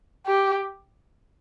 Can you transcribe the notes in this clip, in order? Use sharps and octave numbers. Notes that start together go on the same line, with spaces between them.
G4